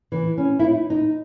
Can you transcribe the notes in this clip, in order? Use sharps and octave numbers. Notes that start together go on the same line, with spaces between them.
E3
C#4
E4
D#4
D#4